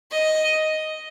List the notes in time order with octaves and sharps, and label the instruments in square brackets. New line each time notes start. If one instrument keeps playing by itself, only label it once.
[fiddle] D#5